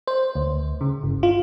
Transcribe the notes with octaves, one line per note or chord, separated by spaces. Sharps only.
C5
D2
C#3
G1
F4